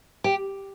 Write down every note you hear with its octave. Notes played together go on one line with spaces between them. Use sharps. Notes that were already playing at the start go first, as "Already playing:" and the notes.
G4